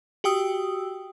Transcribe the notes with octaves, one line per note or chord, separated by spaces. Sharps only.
F#4 G4 G5 D#6 E6